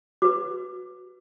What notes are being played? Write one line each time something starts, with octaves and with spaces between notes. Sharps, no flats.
F#4 B4 D6